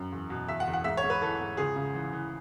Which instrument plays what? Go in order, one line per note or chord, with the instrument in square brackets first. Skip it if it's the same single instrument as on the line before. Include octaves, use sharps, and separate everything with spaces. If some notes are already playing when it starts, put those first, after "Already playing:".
Already playing: [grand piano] F#2
E2
B2
E2 E5
F#5
E2
F#5
G#2 E5
C#5
G#2
B4
E3 A4
G#2
C#2 G#4
C#3
E3
E3